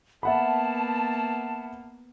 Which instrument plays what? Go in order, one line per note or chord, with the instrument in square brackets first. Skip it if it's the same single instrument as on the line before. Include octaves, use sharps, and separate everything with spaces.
[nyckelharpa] A#3 B3 [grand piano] E5 F#5 B5 [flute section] A5